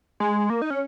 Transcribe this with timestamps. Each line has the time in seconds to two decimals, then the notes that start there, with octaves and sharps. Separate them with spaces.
0.20 G#3
0.50 A#3
0.62 D#4
0.70 C#4